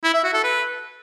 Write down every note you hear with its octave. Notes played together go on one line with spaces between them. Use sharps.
E4
E5
F#4
A4
B4